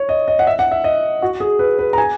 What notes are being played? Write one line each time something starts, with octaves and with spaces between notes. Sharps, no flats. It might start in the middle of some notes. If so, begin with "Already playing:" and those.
Already playing: C#5
D#5
D#5
F#5
E5
F#5
E5
D#5
F#4
G#4
B4
B4
A#5
G#5